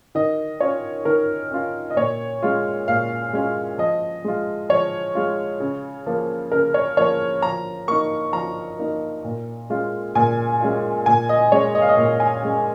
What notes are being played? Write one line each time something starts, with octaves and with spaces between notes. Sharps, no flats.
D#3 D#5
C#4 F4 C#5
D#3 A#4
C#4 F4
D#5
A#2 C#5
G#3 C#4 F4
A#2 F5
G#3 C#4 F4
F3 D#5
G#3 F4
F3 C#5
G#3 F4
C#3
F3 A#3
C#3 A#4
C#5
F3 A#3 C#5
F3 A#5
A#3 D#4 C#6
F3 A#5
A#3 D#4
A#2
G#3 C#4 F4
A#2 G#5
G#3 C#4 F4
A#2 G#5
D#5
G#3 C#4 C#5
D#5
F5
D#5
A#2
G#5
G#3 C#4